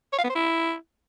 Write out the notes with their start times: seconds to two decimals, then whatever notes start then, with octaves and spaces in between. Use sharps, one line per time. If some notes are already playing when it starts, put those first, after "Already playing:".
0.13 C#5
0.19 F5
0.24 B3
0.30 C5
0.35 E4